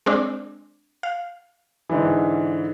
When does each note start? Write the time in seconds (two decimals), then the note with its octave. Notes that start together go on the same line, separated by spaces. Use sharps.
0.06 G#3 C4 D4
1.03 F5
1.89 G#2 D3 E3